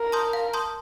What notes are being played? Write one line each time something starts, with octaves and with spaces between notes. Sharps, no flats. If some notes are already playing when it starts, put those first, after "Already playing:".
Already playing: A#4
A5 C6 D#6 G6
F5
A5 C6 D#6 G6